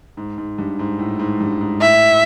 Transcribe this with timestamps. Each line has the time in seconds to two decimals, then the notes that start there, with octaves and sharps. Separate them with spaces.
0.17 G#2
0.38 G#2
0.58 G2
0.79 G#2
0.99 A2
1.19 G#2
1.40 G2
1.61 G#2
1.81 A2 E5